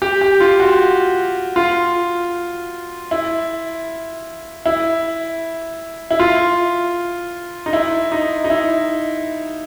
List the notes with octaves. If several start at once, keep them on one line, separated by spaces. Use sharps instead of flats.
G4
G4
F4
F#4
F4
E4
E4
E4
F4
D#4
E4
D#4
D#4
E4